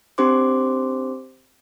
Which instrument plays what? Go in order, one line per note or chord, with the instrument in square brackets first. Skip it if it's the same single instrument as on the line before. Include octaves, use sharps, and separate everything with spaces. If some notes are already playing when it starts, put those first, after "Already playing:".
[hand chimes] C4 D4 G4 C5 C6 D6